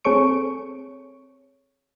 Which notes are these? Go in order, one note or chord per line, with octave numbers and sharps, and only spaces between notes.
C4 G#4 A4 C#5 C#6 D7